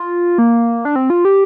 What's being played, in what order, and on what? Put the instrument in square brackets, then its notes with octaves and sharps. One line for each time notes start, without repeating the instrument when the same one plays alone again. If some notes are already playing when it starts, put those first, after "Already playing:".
Already playing: [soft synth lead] F4
A#3
D4
C4
F4
G4